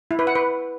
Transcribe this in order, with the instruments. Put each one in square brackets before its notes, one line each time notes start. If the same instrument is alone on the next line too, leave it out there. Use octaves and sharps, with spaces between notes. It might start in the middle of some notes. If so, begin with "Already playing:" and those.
[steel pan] E4
B4
F#5
B4